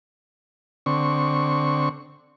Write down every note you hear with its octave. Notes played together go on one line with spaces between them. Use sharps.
D3 C4 C#6